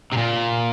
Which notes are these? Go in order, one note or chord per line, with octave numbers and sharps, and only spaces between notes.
C3
A#2